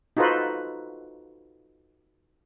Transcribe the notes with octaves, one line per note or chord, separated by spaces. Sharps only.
D#4 F4 F#4 A4 B4 C5